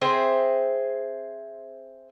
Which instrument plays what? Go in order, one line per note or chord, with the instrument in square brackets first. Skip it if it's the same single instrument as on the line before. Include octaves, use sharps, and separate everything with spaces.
[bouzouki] C4 G#4 C5 E5